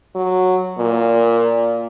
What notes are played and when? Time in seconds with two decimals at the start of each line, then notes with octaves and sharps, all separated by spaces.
0.16 F#3
0.78 A#2